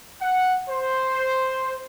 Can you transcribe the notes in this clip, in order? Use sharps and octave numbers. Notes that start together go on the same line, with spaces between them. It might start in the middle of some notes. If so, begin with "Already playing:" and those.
F#5
C5